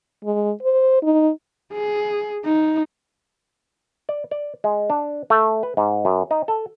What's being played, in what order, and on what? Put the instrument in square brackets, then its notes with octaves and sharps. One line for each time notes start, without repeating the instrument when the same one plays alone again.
[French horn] G#3
C5
D#4
[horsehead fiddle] G#4
D#4
[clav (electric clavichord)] D5
D5
G#3
D4
A3
B4
G#2
F#2
D#4
A4